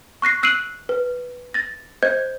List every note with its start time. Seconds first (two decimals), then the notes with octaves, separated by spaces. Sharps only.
0.22 C#6 F#6 A#6 C7
0.43 E6 F#6 C7 D7 D#7 F#7
0.89 B4
1.54 A6 A#6
2.03 C5 D#5 G6 G#6